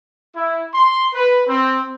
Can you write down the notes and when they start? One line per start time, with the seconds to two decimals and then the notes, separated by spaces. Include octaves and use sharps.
0.36 E4
0.74 C6
1.14 B4
1.48 C4